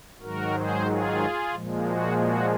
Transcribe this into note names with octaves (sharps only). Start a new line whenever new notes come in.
G#2 D#3 F#3 F#4 A#4
G#4 C5
F4 G#4
A#2 F3 G#3
F#4
F#4